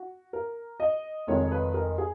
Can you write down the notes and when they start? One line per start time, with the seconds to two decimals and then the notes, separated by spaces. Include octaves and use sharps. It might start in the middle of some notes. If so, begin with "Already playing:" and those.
Already playing: F#4
0.33 A#4
0.80 D#5
1.27 F1 F2 D#3 G#3 C#5
1.52 B4
1.74 A#4
1.98 G#4